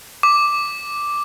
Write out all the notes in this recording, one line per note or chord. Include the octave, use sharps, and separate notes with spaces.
D6